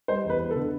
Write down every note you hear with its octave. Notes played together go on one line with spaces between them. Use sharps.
G3 C5
E2
B4
B3
A4
D3